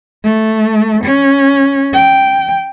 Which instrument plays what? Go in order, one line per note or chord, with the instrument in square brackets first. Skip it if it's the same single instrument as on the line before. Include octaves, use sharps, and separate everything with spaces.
[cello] A3
C#4
G5